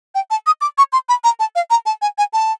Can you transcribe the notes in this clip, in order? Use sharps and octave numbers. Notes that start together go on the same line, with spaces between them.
G5
A5
D#6
D6
C#6
C6
B5
A#5
A5
F5
A#5
A5
G#5
G#5
A5